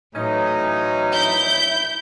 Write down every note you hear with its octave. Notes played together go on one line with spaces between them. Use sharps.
A2 E3 F#3 C#4 D#4
E4 G6